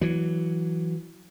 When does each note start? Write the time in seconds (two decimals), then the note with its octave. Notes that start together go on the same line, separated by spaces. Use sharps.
0.01 E3 F#3